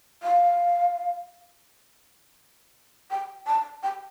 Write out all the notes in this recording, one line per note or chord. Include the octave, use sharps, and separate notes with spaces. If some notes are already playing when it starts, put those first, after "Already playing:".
F5
G5
A5
G5